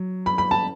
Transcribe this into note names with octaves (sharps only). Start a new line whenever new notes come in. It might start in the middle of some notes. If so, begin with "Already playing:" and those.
Already playing: F#3
B5
B5
A5